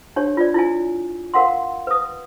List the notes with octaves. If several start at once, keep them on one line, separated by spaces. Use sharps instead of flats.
D4 G4 C#5
F4 D5
E4 F4 G#5
A#4 F5 F#5 C6
B4 D#6